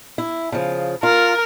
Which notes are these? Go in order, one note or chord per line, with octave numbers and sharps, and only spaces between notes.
E4
C#3 F3
F4 A#4